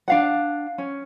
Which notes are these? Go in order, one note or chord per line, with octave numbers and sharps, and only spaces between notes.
D4 F5 F#5
C#4